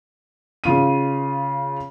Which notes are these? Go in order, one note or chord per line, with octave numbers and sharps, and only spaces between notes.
C#3 F4 D#7